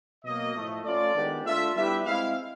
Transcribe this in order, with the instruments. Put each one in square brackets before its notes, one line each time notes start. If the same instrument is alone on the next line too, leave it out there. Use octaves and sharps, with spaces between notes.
[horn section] B2 F#3 A#3 [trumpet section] D#5
[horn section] A2 F3 A3
[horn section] A3 C#4 F4 [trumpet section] D5
[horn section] D#3 G#3 B3 D4 G4
[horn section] A3 D4 F4 [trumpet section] E5
[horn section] G3 B3 E4 G4 B4 [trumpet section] E5
[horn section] G#3 C4 E4 [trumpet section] F5